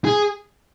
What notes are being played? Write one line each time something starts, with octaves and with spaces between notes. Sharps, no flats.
G#4